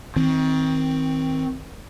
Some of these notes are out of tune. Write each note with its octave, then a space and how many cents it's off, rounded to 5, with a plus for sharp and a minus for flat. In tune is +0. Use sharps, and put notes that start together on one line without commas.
D#3 +30 C4 +0